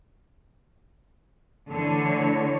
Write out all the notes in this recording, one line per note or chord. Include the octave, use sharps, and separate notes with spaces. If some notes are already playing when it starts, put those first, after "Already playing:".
D3 E3 A3 C#5